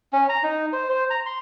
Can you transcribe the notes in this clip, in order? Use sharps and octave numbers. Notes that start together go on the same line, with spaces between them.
C#4
A#5
D#4
C5
C5
A#5
C6